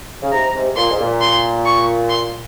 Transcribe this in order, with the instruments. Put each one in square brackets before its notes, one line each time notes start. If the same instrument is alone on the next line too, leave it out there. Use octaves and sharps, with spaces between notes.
[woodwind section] C#3
[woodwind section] G#2 C3 [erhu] A#5
[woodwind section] G#2 C3
[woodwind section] A#2 [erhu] C6
[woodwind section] G#2
A#2
[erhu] C6
C#6
C6